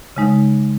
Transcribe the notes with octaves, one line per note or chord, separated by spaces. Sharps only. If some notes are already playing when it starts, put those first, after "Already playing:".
C#3 G#3 D#4